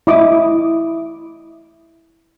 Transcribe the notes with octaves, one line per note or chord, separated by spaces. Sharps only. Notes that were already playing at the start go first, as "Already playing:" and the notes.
E4 D#5 D6 D#6